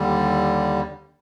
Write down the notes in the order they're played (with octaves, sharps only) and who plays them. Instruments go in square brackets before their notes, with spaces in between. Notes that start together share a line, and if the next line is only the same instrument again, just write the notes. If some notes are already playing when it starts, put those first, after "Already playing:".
Already playing: [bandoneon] D#2 D3 G3